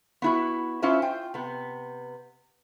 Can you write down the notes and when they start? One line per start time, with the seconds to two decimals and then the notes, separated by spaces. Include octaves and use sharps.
0.22 B3 E4 F#4
0.82 C#4 E4 F4 C5 E5
1.02 F4 G5
1.34 C3 B3